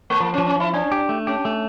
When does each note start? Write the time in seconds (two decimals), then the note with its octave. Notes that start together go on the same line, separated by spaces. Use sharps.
0.10 A3
0.20 F3 A#3
0.34 C#4
0.38 F3
0.47 C#4
0.56 F3 E4
0.74 C#4 D4
0.92 G4
1.09 A3
1.27 C#4 G4
1.45 A3